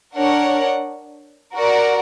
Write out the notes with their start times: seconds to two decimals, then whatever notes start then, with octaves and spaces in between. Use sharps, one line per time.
0.15 D4 A#4 C#5 F#5
1.54 F#4 A#4 D5 F#5